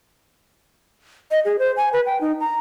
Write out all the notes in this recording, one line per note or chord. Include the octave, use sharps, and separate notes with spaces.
D#5
G#4
C5
G#5
B4
G5
D#4
A#5